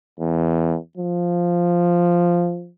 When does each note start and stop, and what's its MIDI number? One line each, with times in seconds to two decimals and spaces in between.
0.20 0.77 40
0.97 2.70 53